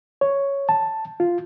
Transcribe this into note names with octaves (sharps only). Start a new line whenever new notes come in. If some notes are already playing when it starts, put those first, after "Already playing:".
C#5
A5
F4